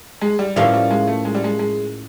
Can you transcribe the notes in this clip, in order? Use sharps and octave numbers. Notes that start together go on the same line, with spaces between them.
G#3
G3
A2 F3 G3 A#3 C#4 F4
G3
G#3
A3
G#3
G3
G#3
G#3